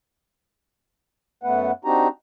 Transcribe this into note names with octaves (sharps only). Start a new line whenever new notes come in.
F#2 A3 B3 B4 F#5
C4 D4 D#4 F#4 G4 A#5